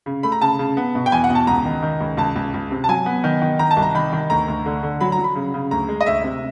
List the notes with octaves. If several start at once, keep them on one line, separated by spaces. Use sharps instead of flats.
C#3
A3 B5
A#5
C#3 A5
C#3
B3
B2
G5
E2 G#5
F#5
B2
A5
C#2 A#5
D#3
D#3
C#2
C#2 A5
C#2
C#2
C3
A5
F#3 G#5
B3
D#3
D#3
D#3 A#5
A5
C2
A#5
D#3 B5
D#3
D2 A#5
D2
D3
D3
F#3 B5
A#5
F#3
B5
C#3
C#3
D2 A#5
G#3
D#5
D2 E5
C3